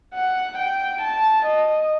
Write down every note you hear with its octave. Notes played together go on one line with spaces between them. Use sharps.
F#5
G5
A5
D#5